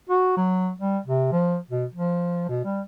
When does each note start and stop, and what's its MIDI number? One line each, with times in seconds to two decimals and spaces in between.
0.10 0.36 66
0.37 0.71 54
0.79 0.98 55
1.06 1.27 48
1.32 1.58 53
1.70 1.85 47
1.94 2.46 53
2.49 2.60 47
2.65 2.81 55